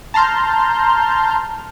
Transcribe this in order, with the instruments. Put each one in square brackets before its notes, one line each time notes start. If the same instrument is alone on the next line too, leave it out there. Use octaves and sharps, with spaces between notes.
[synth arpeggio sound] A5 A#5 C6 F6 G6